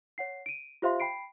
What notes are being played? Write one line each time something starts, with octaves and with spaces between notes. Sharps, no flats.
C#5 F#5 C7
D7 D#7
F4 G4 C5 E5 F5 C6
G5 B5 C7 D7